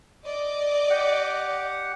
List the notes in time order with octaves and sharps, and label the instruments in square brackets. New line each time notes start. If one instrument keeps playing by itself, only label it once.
[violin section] D5 D#5 D6
[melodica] G4 F#5